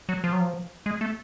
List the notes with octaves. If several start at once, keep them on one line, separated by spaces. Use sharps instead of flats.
F#3
F3
F#3
F3
G#3
A3